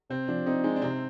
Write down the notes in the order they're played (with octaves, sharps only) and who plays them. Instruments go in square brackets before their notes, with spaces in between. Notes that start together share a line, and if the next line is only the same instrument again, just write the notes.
[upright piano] C3 [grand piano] C4
[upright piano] F3 [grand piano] D4
[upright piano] C4 [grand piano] D#4
[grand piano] G#3 [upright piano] D#4
[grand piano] D4
[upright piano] C3 [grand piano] C4